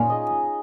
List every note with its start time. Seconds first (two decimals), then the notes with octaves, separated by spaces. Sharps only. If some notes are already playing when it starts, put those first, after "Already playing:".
Already playing: A#2 A#3 C#4 D#4 F4
0.10 G#4 D#5